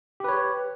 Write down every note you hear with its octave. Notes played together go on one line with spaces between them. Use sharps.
G4 B4 C#5